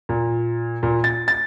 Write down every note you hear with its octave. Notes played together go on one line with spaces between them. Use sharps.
A#2
A#2
A6
A6